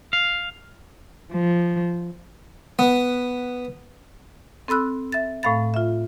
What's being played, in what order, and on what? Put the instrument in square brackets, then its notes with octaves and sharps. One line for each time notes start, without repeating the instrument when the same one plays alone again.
[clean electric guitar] F5
[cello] F3
[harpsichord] B3
[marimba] C4 A4 B5 E6 F#6
E5 A6
A2 A3 F5 B5 A6
F4 E5